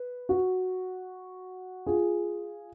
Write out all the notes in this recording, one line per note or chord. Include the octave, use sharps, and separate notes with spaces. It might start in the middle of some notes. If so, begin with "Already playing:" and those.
Already playing: B4
F#4
F4 G#4